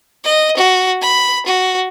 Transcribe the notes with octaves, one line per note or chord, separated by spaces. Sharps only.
D#5
F#4
B5
F#4